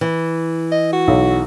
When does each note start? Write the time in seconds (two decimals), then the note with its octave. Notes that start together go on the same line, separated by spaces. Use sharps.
0.01 E3
0.72 D#5
0.92 F#4
1.08 B1